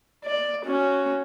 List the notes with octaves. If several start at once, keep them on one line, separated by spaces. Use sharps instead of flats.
D5
C#4 F#4